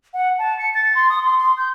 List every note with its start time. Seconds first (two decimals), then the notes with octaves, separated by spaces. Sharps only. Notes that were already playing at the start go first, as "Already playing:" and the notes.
0.14 F#5
0.39 A5
0.59 C#7
0.74 A6
0.95 C6
1.10 D#6
1.22 C6
1.39 C6
1.57 G6